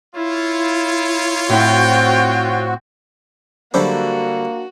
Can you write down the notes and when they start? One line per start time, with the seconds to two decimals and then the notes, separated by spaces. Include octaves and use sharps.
0.16 E4 F4 C#5
1.50 A2 C4 E4 F#4 G5
3.74 D3 F#3 G3 A#3 D4 E4 F#4 C5